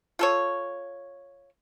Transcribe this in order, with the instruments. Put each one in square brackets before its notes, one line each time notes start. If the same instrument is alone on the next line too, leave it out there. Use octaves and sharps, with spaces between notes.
[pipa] F4 A4 C#5